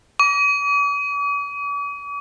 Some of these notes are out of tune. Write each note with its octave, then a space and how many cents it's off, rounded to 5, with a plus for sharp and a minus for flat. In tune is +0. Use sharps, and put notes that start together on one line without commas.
D6 -45